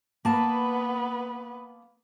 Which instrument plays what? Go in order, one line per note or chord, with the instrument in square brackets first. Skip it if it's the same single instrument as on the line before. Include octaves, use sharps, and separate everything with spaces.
[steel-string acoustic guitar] A#3 A5 [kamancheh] B3 B4